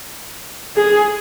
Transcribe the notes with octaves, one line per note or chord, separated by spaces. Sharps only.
G#4